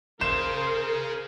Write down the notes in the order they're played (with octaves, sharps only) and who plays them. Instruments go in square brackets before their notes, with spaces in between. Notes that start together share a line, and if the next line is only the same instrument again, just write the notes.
[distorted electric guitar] G#4 F5 [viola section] A#4 [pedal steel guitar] C5 [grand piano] E7